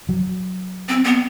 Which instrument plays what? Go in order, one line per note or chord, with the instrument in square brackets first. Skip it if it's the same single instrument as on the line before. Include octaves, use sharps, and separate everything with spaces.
[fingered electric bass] F#3
[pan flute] C4
B3